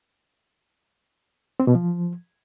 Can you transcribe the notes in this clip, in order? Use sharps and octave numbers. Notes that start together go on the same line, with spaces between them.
C4
B2
F3